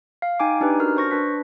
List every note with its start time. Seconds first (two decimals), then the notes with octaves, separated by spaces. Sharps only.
0.22 F5
0.40 D#4 G5 G#5 D6
0.61 D4 D#4 G4 B4
0.79 C#4 D4 F#4 A#4 F6
0.97 C5 C#6 A#6
1.11 D4 B4 B6